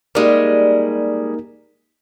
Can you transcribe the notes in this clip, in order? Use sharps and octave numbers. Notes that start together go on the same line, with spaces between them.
G3 G#3 A#3 D#4 A#4